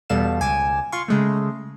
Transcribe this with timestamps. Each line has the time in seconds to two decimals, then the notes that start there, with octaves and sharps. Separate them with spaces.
0.10 E2 B2 G3 A4 F5 E7
0.40 C#2 G#5 D6 E7
0.92 F4 F5 C6 C#6
1.08 C#3 G#3 A3